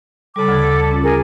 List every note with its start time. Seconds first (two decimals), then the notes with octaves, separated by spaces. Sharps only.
0.36 C#3 G3 A4 B5 D6
0.48 D2 D3 G#6
0.91 C#4 F4
1.04 G#4 A#4 G#5